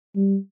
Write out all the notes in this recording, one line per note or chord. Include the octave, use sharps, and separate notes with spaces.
G3